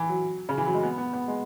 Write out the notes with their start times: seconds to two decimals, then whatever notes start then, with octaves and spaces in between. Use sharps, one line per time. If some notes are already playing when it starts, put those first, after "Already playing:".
Already playing: E3
0.09 F#3
0.49 C#3
0.58 E3
0.66 F#3
0.74 G#3
0.83 B3
0.98 B3
1.13 B3
1.28 G#3